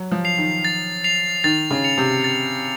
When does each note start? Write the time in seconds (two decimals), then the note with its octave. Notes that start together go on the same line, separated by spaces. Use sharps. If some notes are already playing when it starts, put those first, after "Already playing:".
Already playing: F#3
0.12 F3
0.25 C7 F7
0.38 D#3
0.65 A6
1.04 C7 F7
1.44 D#3 A6
1.71 C#3
1.84 C#7 F7
1.98 C3
2.24 A6